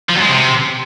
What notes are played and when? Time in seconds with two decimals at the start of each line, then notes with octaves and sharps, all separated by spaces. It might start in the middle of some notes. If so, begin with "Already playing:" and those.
0.10 F3
0.16 F#2
0.22 G#3
0.29 C3